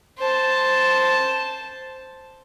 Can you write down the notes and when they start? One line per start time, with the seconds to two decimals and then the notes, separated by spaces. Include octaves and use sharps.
0.19 C5 A5